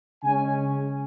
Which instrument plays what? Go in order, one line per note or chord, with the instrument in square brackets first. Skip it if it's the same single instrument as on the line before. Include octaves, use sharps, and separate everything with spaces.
[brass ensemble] C#3 G#3 C#4 G#5